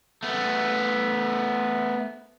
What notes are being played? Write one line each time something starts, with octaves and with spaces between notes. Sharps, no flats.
A3 B3